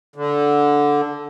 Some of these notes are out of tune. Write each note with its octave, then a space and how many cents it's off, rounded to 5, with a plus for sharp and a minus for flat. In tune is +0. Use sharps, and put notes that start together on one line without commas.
D3 -10